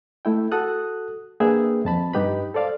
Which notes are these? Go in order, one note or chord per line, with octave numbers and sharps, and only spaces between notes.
A3 E4 G5
F#4 A4 D#6 F#6
A#3 D4 G#4 B4 E5 G5
F2 A5 B5
G2 D#4 G4 B4 B5
A4 C5 D5 F5